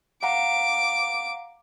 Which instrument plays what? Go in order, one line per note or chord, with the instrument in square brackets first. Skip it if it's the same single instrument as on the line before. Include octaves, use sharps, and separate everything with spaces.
[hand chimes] F5 F#5 A#5 [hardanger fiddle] D6